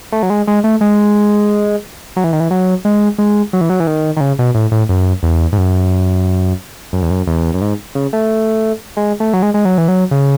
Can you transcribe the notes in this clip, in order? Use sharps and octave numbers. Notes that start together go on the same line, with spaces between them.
A3
F#3
G#3
G#3
A3
G#3
F#3
E3
D#3
E3
F#3
G#3
G#3
F#3
E3
F#3
E3
D#3
D#3
C#3
B2
A2
A2
F#2
E2
G#2
F#2
F#2
E2
F#2
E2
F#2
G#2
C#3
A3
G#3
A3
F#3
G#3
G#3
F#3
E3
F#3
C#3